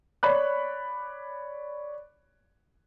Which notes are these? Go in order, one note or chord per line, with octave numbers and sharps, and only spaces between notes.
C#5 D5 B5 F#6